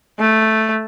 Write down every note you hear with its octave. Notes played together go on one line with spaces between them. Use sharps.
A3